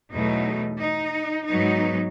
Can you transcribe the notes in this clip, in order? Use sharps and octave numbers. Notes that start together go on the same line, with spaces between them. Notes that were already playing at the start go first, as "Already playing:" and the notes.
E2 B2 F#3 A3 D#4
D#4
G#2 F#3 B3 D#4